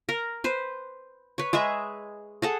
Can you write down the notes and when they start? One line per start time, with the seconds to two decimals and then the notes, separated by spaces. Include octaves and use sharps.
0.09 A#4
0.44 B4 C5
1.38 B4 C#5
1.53 G#3 G#4 B4 E5
2.42 G#4 A4 F#5